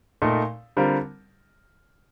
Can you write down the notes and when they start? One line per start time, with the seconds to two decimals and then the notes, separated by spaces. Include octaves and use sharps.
0.22 A#2 A3 D#4
0.77 D3 G3 C4 F4 A#4